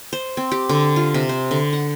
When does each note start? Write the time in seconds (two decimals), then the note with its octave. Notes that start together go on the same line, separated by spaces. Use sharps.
0.13 C5
0.37 C4
0.52 G4
0.69 D3
0.96 F4
1.14 C3
1.29 C5
1.51 D3
1.73 F#5